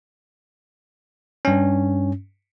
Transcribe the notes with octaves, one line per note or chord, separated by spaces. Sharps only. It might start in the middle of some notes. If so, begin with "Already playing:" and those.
G2 C#4